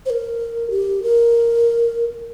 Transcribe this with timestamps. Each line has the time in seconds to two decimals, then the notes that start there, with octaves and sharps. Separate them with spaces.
0.06 C5
0.10 A#4
0.70 G4
1.03 A#4